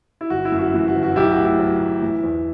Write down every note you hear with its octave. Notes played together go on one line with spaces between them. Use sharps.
E4
G1 F#4
E4
F#2
F#4
E3
F#4
G1
F#4
B1 E4 G4
F#4
A2
E4
F#3
B1
E3
E2